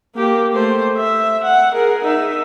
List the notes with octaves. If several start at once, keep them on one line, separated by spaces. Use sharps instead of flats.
A#3 G4
A3 C5
E5
F#5
G#4 A#4
D#4 E5